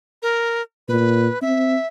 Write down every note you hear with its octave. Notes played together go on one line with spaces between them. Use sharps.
A#4
A#2 B4
C4 E5